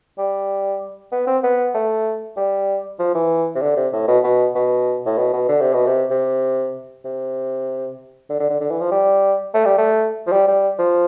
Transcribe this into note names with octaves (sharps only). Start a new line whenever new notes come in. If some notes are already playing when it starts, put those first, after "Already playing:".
G3
B3
C4
B3
A3
G3
F3
E3
C3
D3
C3
A2
B2
B2
B2
A2
B2
B2
D3
C3
B2
C3
C3
C3
D3
D3
D3
D3
E3
F3
G3
A3
G3
A3
F3
G3
G3
F3